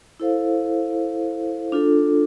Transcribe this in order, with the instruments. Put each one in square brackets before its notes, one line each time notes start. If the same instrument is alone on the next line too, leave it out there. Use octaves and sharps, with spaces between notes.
[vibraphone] E4 A4 C5 F5
D4 F4 A4